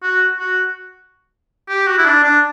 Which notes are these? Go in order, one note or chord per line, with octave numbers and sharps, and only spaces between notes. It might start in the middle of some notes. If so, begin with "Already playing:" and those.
F#4
F#4
G4
F#4
E4
D4
D4